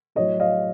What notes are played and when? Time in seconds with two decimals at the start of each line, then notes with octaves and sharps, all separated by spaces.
0.15 A2 F#3 C#5 D#5
0.40 D#5 F5